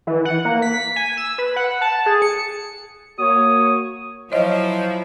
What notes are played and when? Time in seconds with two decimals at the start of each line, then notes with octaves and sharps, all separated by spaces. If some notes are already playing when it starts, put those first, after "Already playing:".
0.07 E3
0.25 F#5
0.45 A#3
0.62 B6
0.96 G#5
1.17 E6
1.38 B4
1.56 F#5
1.81 A5
2.06 G#4
2.22 C#7
3.18 A#3 F#4 C#5 D#6
4.32 F3 F#3 E4 C#5 D#5